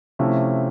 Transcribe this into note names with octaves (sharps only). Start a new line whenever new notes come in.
C3 F3 A3 C#4 E4